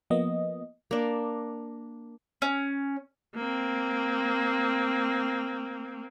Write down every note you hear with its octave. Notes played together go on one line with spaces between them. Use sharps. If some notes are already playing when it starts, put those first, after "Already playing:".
F3 A#3 B3 D#5
A#3 D4
C#4
A#3 C4